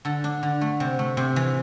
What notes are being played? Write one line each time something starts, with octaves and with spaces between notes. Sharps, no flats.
D3 A4
D4
D3
A3
C3
A3
C3
E3